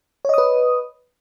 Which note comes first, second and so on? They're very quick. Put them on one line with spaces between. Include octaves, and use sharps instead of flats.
C#5 D#5 D#6 B4